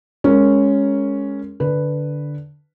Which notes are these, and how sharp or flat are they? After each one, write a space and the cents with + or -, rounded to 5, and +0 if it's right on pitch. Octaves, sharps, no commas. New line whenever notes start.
G#3 +0 C#4 +0 A#4 +0
D3 +0 B4 +0